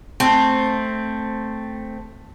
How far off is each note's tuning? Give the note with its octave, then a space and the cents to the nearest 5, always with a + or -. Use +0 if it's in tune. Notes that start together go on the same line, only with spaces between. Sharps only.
A3 +0 C4 +0